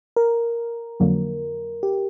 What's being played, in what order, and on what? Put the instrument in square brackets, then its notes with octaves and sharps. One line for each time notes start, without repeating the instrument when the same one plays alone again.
[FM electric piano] A#4
[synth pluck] F2 D3 F#3 A#3
[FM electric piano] G4